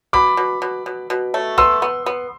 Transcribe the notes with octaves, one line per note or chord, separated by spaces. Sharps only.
B2 B5 D6
B2
B2
B2
B2
A3
B3 C6 E6
B3
B3